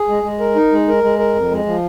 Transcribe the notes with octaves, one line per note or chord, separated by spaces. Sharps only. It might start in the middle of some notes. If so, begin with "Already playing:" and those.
Already playing: G#4
G#3
G#3
A#4
D#4
G#3
A#4
G#3
A#4
F2
G#3
F3